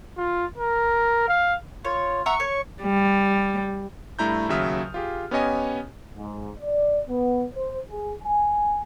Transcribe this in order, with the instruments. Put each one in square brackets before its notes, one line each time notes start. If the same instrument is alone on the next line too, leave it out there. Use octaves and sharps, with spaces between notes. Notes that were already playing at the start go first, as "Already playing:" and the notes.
[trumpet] F4
A#4
F5
[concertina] F4 [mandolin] C#5
[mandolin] E5 F#5 A#5 [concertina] C#6
[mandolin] C#5
[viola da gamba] G3
[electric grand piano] G2 A3 E4 A#5 G6
D#2 C#3 F#3 E5 D#6 F6
F4 G4 G#4
B3 C#4 G4 C#5 D#5 G#5
[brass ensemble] G#2
D5
B3
C5
G#4
G#5